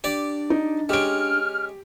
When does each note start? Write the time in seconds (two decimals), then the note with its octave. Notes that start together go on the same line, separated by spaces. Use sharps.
0.04 D4 G4 D5
0.50 D#4
0.89 G#3 C#4 G4 F6 D7